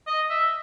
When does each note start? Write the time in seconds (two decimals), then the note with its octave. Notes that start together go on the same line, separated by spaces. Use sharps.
0.07 D#5
0.30 E5